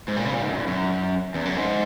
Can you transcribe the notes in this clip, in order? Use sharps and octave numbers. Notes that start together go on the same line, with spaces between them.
G#2
A#2
C#3
A#2
G#2
F#2
E2
F#2
E2
F#2
G#2